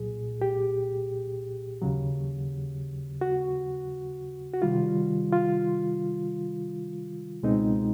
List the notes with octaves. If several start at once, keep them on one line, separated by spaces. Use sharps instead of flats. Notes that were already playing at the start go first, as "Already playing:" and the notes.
Already playing: C2 A#2 F#3 G#4
G4
D#2 C#3 F#3
F#4
F#4
C3 D#3 G3 F4
F4
C#2 B2 G#3 C4 D#4